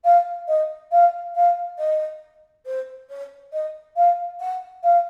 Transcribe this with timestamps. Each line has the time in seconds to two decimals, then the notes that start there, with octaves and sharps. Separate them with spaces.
0.04 F5
0.47 D#5
0.91 F5
1.35 F5
1.78 D#5
2.65 C5
3.09 C#5
3.52 D#5
3.96 F5
4.40 F#5
4.83 F5